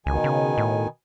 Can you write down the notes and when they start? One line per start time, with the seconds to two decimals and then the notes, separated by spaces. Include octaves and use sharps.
0.06 C#2 B2 D#3 G#5
0.24 C#3
0.58 A2